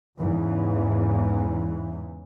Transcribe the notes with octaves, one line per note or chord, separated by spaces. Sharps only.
E2 G#2 C#3 E3